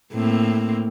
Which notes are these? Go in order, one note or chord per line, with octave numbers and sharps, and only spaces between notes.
A2 A#3 C4